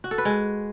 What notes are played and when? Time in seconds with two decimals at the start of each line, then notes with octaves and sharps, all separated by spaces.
0.04 F#4
0.11 A4
0.18 B4
0.25 G#3